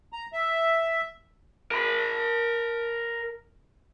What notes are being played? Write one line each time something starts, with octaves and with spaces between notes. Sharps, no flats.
A#5
E5
A#4 B5